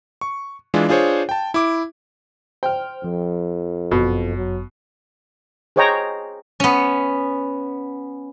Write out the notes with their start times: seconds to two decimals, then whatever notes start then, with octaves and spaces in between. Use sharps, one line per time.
0.21 C#6
0.74 E3 G#3 D4 F4
0.89 D4 F4 G#4 C5 C#5
1.29 G5 A5
1.54 E4 D6
2.63 C5 G5 F6
3.04 F2 F3
3.91 G1 F#2 B2
4.37 F#3
5.76 G#4 C5 C#5 D#5 G5 A#5
6.60 B3 C#4